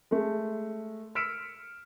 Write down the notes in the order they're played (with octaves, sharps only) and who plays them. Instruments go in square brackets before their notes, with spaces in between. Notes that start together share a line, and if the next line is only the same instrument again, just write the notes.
[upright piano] G#3 A3
E6 F6 B6 C#7 D7 E7